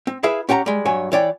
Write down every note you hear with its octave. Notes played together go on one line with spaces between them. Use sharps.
C4
E4 G#4 B4 E5 F5
C#4 G4 F#5 G#5 A#5
G3 G#3
G2 F#3 C#5 G#5
E3 C#5 D5 G5